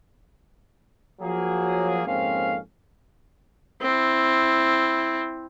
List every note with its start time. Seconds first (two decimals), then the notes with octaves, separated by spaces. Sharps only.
1.21 F3 F#3 A#3 G#4
2.06 F2 G#2 A#3 C4 C#4 F5
3.82 C4 E4